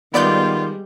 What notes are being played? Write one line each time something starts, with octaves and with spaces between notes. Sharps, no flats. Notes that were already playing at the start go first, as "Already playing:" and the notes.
D#3 G3 G#3 B3 F4 D5 G6